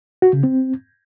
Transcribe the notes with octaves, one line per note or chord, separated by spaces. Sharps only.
F#4
C#3
C4